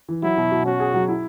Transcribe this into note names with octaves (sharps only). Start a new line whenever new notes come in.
E3
F#3 E4
B2
B2
C#4 F#4
G#4
F#3
E4